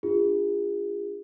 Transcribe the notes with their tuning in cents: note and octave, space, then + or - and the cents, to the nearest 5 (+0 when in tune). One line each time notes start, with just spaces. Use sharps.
D4 +25 F4 +0 G#4 -35